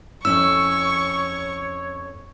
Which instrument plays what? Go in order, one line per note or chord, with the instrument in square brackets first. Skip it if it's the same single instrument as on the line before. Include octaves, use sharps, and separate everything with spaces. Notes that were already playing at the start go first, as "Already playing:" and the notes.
[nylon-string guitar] F2 C#4 E4 [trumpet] C#5 [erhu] C#6 [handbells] E6